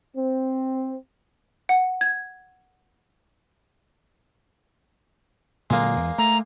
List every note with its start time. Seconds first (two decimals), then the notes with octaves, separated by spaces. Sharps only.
0.16 C4
1.69 F#5
2.01 G#6
5.70 A#2 D3 F#3 G#3 A#3
5.96 E2
6.18 A3 A#5